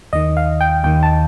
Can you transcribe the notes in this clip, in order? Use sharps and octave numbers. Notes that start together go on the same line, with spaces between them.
D#2 D#3 D#5
F5
G5
D#2 D#3 G5
A5